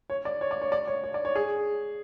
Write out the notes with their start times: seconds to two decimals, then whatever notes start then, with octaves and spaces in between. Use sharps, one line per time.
0.10 C#5
0.25 D5
0.41 C#5
0.51 D5
0.62 C#5
0.72 D5
0.87 C#5
1.04 C#5
1.14 D5
1.25 C#5
1.35 G#4